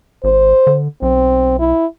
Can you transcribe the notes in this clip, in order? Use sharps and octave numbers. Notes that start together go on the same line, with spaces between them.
G#1 C5
D3
B1 C4
E4